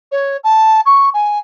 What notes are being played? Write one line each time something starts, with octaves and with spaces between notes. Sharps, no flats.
C#5
A5
C#6
G#5